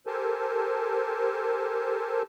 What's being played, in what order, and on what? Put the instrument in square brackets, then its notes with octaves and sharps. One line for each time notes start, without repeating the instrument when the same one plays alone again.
[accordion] G4 A4 A#4 C5 G#5 A5